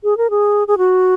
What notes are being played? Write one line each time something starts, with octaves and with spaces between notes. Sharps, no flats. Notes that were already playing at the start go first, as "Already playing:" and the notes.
G#4
A#4
G#4
G#4
F#4